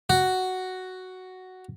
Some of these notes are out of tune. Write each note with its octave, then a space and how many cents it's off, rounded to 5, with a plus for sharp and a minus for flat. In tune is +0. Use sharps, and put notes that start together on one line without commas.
F#4 +5